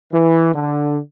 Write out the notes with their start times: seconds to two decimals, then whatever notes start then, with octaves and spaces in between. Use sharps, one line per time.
0.13 E3
0.54 D3